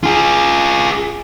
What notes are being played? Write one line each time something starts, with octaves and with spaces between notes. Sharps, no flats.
F4 G#4